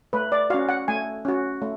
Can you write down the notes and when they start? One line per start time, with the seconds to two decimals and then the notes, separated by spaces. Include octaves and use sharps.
0.13 A3 B4
0.32 D5
0.50 C#4 F#4 F5
0.69 F#5
0.88 A3 G#5
1.25 C#4 F#4
1.62 A3